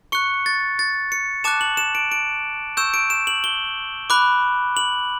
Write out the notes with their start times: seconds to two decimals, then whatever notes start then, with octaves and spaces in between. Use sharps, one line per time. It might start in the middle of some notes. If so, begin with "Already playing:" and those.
0.12 C#6 F#6 C#7
0.46 A6
0.79 A6
1.12 C#7
1.44 A5 D6 F#6 E7
1.61 F#7
1.77 E7
1.95 D7
2.12 D7
2.77 C#6 E6 G6 E7
2.94 D7
3.10 E7
3.27 F#7
3.44 G7
4.10 B5 D6 F#6
4.77 F#7